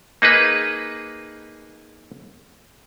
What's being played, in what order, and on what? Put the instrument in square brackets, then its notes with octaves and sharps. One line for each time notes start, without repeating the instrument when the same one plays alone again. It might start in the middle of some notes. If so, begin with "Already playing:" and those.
[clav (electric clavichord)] A#3 D#4 G#4 B4